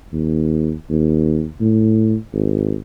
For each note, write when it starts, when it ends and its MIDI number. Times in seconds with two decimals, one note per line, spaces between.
0.13 0.73 39
0.90 1.47 39
1.60 2.15 45
2.33 2.76 32